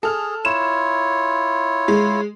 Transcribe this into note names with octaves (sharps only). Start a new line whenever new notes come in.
G#4 A4 F6
E4 F4 C#5 E7
G#3